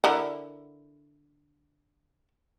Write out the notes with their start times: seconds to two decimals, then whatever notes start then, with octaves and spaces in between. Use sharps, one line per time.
0.04 D3 E4 A#4